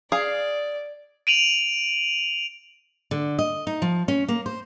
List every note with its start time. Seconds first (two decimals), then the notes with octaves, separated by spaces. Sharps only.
0.12 G#4 D5 F5
1.27 D7 D#7 F7 F#7
3.11 D3
3.39 D#5
3.67 D#4
3.82 F3
4.08 C#4
4.28 A#3
4.46 C5